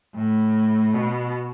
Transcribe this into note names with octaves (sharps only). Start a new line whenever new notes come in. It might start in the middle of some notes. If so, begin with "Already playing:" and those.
A2
B2